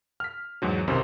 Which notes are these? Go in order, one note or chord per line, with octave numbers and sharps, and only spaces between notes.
F6 B6
E2 G#2 F#3
B1 F#2 C3 D#3 C5